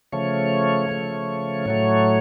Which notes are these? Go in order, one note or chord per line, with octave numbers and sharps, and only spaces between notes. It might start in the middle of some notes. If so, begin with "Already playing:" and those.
C#3 F3 A3 C#5
C#3 F3 A3
A2 F#3 A3